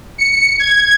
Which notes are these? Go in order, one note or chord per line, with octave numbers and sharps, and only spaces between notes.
C#7
G#6